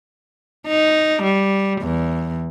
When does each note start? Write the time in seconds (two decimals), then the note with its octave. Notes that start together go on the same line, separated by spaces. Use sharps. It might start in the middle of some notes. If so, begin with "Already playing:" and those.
0.68 D#4
1.23 G3
1.82 E2